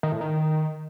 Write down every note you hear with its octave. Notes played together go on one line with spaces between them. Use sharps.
D#3
A2
D#3